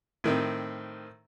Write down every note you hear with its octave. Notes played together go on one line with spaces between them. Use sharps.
A2 D#3 C4